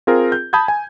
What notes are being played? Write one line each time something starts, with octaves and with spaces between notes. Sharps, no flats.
C4 F4 G#4 A#4
G6
A5 B5 D#6 G6 G#6
G#5